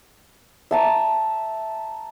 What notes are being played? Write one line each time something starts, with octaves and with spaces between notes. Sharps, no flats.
E5 A5 A#5